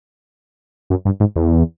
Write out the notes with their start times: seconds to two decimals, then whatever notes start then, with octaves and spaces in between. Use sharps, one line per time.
0.90 F#2
1.05 G2
1.20 G#2
1.36 E2